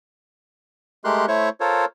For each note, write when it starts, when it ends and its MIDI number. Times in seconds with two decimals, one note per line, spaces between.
1.05 1.26 56
1.05 1.26 57
1.05 1.26 67
1.05 1.26 70
1.05 1.26 84
1.05 1.26 90
1.28 1.49 57
1.28 1.49 64
1.28 1.49 72
1.28 1.49 73
1.28 1.49 85
1.60 1.85 65
1.60 1.85 69
1.60 1.85 70
1.60 1.85 72
1.60 1.85 73